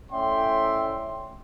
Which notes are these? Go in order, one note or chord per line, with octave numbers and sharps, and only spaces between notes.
A2 C#4 D5 E5 G5 C6